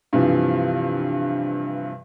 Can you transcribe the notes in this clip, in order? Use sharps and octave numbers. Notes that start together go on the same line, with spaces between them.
G2 C3 E3 F3